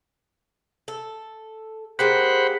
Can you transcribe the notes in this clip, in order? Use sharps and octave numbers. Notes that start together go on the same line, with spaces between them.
A4
G#3 A#3 G4 C5 F#5 B5